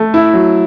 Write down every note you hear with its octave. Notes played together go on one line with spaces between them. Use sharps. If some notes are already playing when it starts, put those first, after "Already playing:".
Already playing: A3
E4
F#3